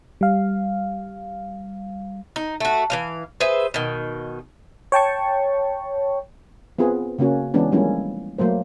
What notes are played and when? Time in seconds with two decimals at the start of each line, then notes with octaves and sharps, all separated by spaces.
0.21 G3 F5
2.36 D#4
2.60 A3 F#4
2.90 E3 G3 F5
3.40 G#4 B4 C5 E5
3.74 B2 D#3
4.92 C#5 G5 A5 C#6
6.79 B3 C4 F4 G#4 B4
7.18 C#3 A#3 C#4 F#4
7.54 E3 G#3 B3 C#4 D4
7.72 F3 G3 G#3 A#3 C#4 E4
8.38 F#3 A3 A#3 C5